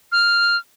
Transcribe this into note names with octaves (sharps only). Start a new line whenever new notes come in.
F6